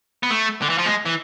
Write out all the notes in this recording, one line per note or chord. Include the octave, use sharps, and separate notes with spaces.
B3
A3
D3
E3
F3
G#3
E3